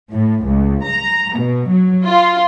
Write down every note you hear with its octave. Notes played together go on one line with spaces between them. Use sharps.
A2
C#2
A#5
B2
F#3
F4